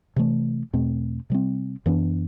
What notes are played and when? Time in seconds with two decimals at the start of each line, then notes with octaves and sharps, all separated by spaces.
0.16 C3 E3 A3
0.73 E2 B2 A3 C4
1.30 C3 G3 C4
1.86 F#2 E3 B3 D4